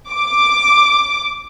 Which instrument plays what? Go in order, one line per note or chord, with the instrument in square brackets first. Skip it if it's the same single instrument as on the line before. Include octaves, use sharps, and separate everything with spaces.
[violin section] D6